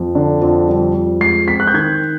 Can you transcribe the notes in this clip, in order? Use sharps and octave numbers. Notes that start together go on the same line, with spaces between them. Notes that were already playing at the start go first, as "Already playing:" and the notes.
Already playing: F2
D3
F2
G3
F2
G#3 C7
C4 B6
F#6
G6
D#3 G#6